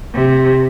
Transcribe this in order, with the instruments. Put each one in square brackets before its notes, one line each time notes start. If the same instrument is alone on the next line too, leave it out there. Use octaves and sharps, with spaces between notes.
[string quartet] C3